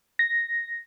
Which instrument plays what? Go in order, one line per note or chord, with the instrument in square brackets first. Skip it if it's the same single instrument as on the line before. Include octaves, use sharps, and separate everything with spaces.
[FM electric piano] A#6